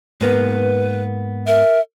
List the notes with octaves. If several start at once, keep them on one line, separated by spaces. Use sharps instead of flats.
G#2 A#3 B3 B4
A#4 E5